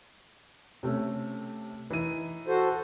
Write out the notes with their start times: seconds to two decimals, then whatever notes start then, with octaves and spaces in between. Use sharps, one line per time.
0.83 C3 A3 C#4
1.90 E3 D#4 D#7
2.48 F#4 A4 C5